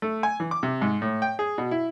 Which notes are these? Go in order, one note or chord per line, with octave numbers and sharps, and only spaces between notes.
A3
G#5
E3
D6
C3
G#2
A2
G5
G#4
B2
E4